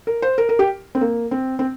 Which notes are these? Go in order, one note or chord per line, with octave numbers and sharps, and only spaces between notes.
A#4
C5
A#4
A#4
G4
C4
A#3
C4
C4